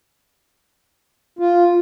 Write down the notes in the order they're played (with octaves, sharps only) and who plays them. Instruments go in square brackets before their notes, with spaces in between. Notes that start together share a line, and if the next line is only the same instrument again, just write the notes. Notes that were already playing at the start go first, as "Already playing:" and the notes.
[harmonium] F4